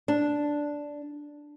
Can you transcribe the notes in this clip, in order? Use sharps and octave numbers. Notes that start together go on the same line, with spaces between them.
D4